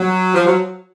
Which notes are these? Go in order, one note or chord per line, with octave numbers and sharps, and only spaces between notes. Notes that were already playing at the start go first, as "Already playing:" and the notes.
Already playing: F#3
F3
F#3